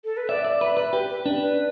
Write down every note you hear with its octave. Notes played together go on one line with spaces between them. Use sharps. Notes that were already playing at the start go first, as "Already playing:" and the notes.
A4
B4
D5 E5
D5
B4 E5
B4
G4 B4
B4
D4
B4